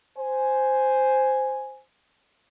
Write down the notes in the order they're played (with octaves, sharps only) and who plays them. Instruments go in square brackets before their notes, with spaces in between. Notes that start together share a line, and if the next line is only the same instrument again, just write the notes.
[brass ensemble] C5 G#5